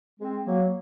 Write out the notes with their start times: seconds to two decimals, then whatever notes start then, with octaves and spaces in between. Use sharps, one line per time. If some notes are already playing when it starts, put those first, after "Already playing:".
0.19 G#3 C4
0.45 F#3 A#3